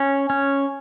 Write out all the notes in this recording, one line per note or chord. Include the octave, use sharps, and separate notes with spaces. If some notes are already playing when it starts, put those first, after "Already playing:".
Already playing: C#4
C#4